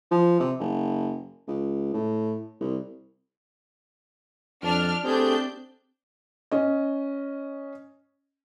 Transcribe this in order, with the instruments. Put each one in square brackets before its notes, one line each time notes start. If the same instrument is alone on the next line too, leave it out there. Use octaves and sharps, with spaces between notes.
[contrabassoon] F3
C3
F#1
C#2
A2
C2
[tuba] F2 [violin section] D4 F6
[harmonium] A3 G4 G#4 [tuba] C4 [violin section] D4 G6
[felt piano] C#4 D#5